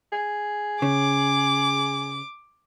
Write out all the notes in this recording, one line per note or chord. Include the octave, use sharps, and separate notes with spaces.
G#4
C#3 D6